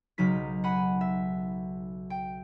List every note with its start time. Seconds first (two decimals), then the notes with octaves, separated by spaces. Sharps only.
0.18 B1 C#3 F#3 D#4 B6
0.64 F#5 G#5 B5
1.01 E5
2.10 G5